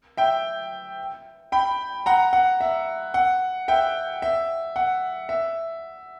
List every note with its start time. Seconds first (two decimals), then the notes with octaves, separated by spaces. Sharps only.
0.17 E5 G5
1.52 G5 B5
2.06 F#5 A#5
2.33 F#5
2.61 E5
3.14 F#5
3.68 E5 G5
4.22 E5
4.76 F#5
5.29 E5